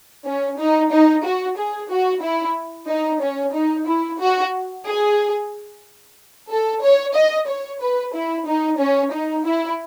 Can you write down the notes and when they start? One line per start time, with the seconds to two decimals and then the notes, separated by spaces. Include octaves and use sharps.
0.25 C#4
0.58 D#4
0.91 D#4
1.24 F#4
1.56 G#4
1.90 F#4
2.22 E4
2.88 D#4
3.21 C#4
3.54 D#4
3.87 E4
4.20 F#4
4.85 G#4
6.50 A4
6.82 C#5
7.14 D#5
7.47 C#5
7.80 B4
8.13 E4
8.46 D#4
8.79 C#4
9.12 D#4
9.45 E4